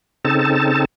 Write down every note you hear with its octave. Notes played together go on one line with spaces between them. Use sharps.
C#3 C4 D#4 A4 A5